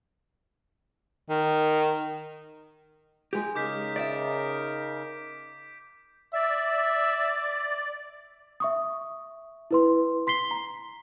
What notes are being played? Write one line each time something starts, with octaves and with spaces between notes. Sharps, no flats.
D#3
G#3 G4
C#3 D#4 A#4 D6 G6 B6
D5 E5 D7
D5 E5
E5 C#6 D#6
E4 B4 C6
C6 B6 C7 G7
A#5